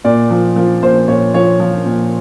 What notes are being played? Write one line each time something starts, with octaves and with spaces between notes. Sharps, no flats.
A#2 D5
F3
F3
A#2 C5
A#2 C#5
F3 C#5
F3
A#2